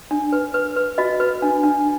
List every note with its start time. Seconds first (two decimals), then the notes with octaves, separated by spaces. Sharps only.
0.11 D4
0.32 B4
0.54 B4
0.76 B4
0.98 F#4 D#5
1.20 B4
1.42 D4
1.63 D4